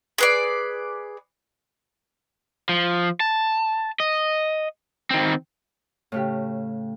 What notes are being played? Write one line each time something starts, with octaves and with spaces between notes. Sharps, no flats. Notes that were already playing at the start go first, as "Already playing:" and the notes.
G#4 B4 D5
F3
A5
D#5
D#3 C4
A2 C#3 G4